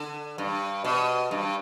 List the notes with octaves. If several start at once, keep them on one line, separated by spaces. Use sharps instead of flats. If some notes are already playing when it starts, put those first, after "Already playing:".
Already playing: D3
G2
B2
G2